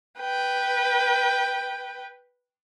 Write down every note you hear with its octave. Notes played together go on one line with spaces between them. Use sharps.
B4 G5